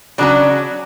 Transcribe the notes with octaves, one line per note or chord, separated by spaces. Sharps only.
C#3 F#3 C#4 D4